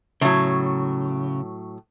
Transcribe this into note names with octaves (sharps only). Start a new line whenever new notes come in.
A2 C#3 F#3